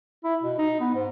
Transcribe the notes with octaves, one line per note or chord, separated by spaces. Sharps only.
E4
B2
D#4
B3
G#2